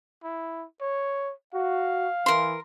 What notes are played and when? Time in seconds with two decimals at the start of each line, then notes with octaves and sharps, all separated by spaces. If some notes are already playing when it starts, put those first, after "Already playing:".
0.23 E4
0.81 C#5
1.54 F#4 F5
2.26 E3 A#4 C6